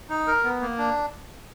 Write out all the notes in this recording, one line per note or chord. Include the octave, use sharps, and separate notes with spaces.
D#4
A#4
B3
A#3
D4